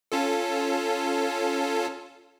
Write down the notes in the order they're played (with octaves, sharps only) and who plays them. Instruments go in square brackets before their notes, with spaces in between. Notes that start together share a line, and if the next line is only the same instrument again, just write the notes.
[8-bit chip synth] C#4 F4 A4